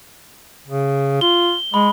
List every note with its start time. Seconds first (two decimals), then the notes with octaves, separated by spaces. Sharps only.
0.68 C#3
1.21 F4 G7
1.74 G#3 B5